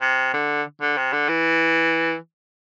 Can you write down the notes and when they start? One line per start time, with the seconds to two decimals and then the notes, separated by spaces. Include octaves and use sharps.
0.01 C3
0.34 D3
0.81 D3
0.97 C3
1.13 D3
1.29 E3